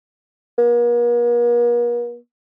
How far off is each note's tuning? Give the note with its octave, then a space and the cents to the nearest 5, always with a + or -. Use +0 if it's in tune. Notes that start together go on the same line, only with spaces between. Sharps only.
A#3 +45